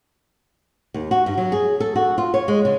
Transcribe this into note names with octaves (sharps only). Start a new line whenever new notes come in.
D#2
F#4
G2
F#3
G#4
A4
F#4
F4
C#5
G#3
C#3